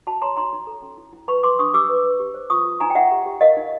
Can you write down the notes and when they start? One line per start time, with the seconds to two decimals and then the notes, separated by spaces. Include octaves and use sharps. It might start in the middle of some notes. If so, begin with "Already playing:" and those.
0.07 F#4 A5 B5
0.22 C#5 A#5 C6
0.37 D#4 A#5 C6
0.53 D#4
0.67 A4
0.82 C#4
0.97 E4
1.13 E4
1.28 B4 B5 C#6
1.43 B4 C6 D6
1.59 D4 C#6 D#6
1.74 G4 D6 E6
1.89 B4
2.04 B4
2.20 G4
2.34 C5
2.50 F4 C#6 D#6
2.65 F4
2.80 D#4 G#5 A#5
2.90 G5
2.95 D#4 E5 F#5
3.11 G4
3.26 G4
3.41 A#4 D#5 F5
3.57 D#4